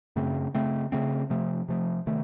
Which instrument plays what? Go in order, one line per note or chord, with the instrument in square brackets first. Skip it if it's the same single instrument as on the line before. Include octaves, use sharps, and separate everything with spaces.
[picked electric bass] F#2 C#3 A3 C4
C#3 A3 C4
C#3 A3 C4
C3 F3 A3
C3 F3 A3
C3 D#3 A3